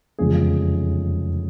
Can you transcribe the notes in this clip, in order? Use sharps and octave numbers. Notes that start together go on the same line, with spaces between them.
F1 E2 C#3 F3 G#3 G#4